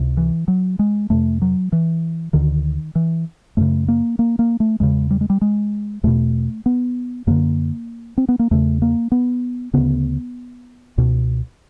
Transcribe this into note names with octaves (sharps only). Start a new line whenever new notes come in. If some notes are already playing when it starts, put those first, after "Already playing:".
Already playing: C#2 C3
E3
F#3
G#3
F2 C3 A3
F#3
E3
D2 D3 D#3
E3
F#2 C#3 A3
A#3
A#3
A#3
A3
E2 C#3 G#3
G3
G#3
G3
G#3
E2 B2 A3
B3
F#2 D3 A#3
C4
B3
A#3
E2 C#3 A3
A#3
B3
D2 C#3 B3
C#2 B2